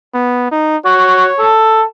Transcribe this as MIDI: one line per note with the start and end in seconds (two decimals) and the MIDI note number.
0.14 0.50 59
0.51 0.77 63
0.85 1.27 66
0.85 1.55 73
1.39 1.82 69